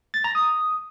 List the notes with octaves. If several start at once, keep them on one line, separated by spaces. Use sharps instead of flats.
A6
A#5
D#6